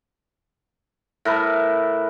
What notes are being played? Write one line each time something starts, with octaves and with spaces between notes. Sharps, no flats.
A2 A#4 B4 A5